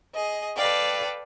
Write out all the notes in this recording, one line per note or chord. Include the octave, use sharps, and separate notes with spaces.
G#4 D#5
A4 B4 D5 F5 G5